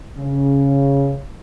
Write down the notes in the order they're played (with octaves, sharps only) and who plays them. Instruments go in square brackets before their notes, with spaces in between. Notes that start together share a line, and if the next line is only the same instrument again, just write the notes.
[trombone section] C#3